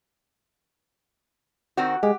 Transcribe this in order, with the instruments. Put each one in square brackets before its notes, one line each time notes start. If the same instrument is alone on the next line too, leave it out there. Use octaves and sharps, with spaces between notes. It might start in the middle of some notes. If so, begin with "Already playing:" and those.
[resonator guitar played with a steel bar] D#3 C4 F#4
[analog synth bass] G#3 [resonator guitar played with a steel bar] G4